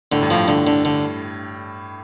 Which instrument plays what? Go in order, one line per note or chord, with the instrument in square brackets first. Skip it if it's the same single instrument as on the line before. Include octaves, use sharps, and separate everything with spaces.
[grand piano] A2 [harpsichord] D3
[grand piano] G2
[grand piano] A2 [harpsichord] F3
[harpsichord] D3
D3
D3